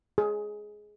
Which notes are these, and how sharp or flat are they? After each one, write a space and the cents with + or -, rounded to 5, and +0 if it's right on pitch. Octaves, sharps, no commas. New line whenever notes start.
G#4 +10